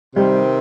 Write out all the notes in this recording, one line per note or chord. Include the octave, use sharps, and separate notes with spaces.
C3 D#3 G3 C4